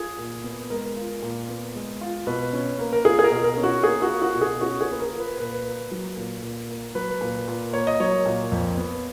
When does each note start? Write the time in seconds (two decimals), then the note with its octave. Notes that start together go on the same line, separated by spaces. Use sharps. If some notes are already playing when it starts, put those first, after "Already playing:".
Already playing: F4 G#4
0.18 A#2
0.44 B3
0.70 G#3 A#4
0.97 F4
1.22 A#2
1.49 B3
1.75 G#3
2.01 F4
2.27 B2 B4
2.53 C#4
2.79 A#3
2.93 A#4
3.05 F4 G#4
3.19 G#4
3.24 A#4
3.31 B2
3.44 A#4
3.57 C#4
3.64 F#4
3.84 A#3 G#4
4.02 F#4
4.09 F4
4.22 F#4
4.35 B2
4.42 G#4
4.61 C#4 F#4
4.81 G#4
4.87 A#3 B4
5.00 A#4
5.13 F4
5.20 B4
5.38 A#2 B4
5.65 A#3
5.91 F#3
6.17 A#2
6.43 A#2
6.69 A#3
6.95 F#3 B4
7.21 A#2
7.48 A#2
7.73 A#3 C#5
7.87 D#5
8.00 F#3 C#5
8.26 A#2
8.52 F2
8.78 B3